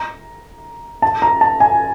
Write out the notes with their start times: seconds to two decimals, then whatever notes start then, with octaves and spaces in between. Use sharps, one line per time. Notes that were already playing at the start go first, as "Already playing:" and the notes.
Already playing: A#5
1.02 A5
1.22 A#5
1.41 A5
1.60 G#5